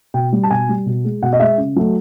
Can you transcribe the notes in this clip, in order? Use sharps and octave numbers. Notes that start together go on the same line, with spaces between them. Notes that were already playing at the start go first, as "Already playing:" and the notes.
B2 G5
G3
A5
B2 G#5
G3
B2
G#3
B2 F#5
D#5
G#3 E5
C#3
F#3 A3